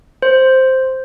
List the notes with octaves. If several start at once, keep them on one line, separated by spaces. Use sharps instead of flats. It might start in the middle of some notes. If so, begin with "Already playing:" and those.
C5